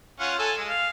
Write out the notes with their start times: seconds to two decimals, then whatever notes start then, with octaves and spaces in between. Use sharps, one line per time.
0.20 C#4 F4 F#5
0.39 A4 G#5
0.57 G#3
0.69 F5